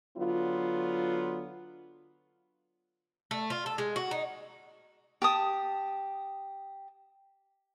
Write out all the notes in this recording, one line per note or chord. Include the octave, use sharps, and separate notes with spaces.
D3 F#3 B3 F4
A3
F4
A4
G#3
F#4
D#4
G4 A5 D#6